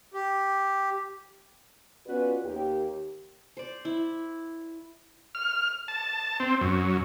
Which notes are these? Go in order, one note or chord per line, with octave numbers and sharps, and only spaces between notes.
G4
B3 C#4 F4 F#4 B4 D5
D#2 G4
C5 D5
E4
F6
A5
C4
F#2